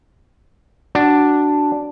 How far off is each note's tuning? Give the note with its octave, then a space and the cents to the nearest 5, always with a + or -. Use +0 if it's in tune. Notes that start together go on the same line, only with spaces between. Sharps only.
D4 +0 F#4 +10